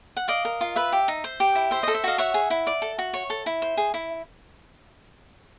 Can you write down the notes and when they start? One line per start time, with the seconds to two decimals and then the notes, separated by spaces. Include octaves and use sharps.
0.17 F#5
0.28 D5 D#5 F5
0.45 A#4
0.61 F4
0.76 B4 E5
0.92 G4
1.08 D#4
1.24 C5
1.40 G4
1.55 E4
1.71 C5 E5
1.83 A4 D#5
1.94 E5
2.04 F#4 D#5 F5
2.18 C#5 E5 F#5
2.34 G#4
2.50 E4
2.67 D5
2.82 A4
2.98 F#4
3.13 C#5
3.30 A4
3.46 E4
3.62 C5
3.77 G#4
3.94 E4